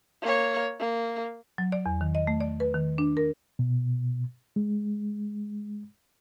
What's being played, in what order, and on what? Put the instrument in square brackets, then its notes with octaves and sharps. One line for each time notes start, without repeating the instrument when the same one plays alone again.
[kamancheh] A#3 C#5
A#3
[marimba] F#3
D5
E2
D#3
D#5
A3
D5
B4
D#3
D4
A#4
[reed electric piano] B2
G#3